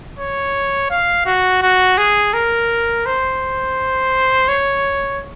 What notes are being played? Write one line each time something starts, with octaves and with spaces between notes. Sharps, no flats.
C#5
F5
F#4
F#4
G#4
A#4
C5
C#5